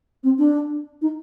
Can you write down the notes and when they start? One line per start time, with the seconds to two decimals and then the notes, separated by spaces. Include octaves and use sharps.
0.23 C4
0.38 D4
1.01 D#4